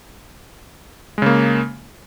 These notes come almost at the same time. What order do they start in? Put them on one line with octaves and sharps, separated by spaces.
G#3 C#3 A#3